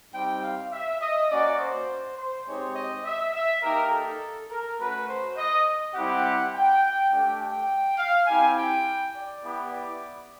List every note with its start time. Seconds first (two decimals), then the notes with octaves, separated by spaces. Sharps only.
0.13 G3 C4 D#4 G4 G5
0.42 F5
0.72 E5
1.01 D#5
1.29 A#3 C#4 F#4 D5
1.59 C5
2.17 C5
2.46 G#3 C4 D#4 G4 C#5
2.75 D#5
3.05 E5
3.34 E5
3.62 A#3 D#4 G4 A#4
3.91 A4
4.50 A#4
4.78 A3 C#4 F#4 B4
5.08 C5
5.36 D#5
5.94 G3 C4 E4 G4 F#5
6.53 G5
7.10 A3 D4 G4 G5
7.39 G5
7.97 F5
8.27 C4 E4 G4 G#5
8.56 G5
9.15 D5
9.43 B3 E4 G4
9.73 D5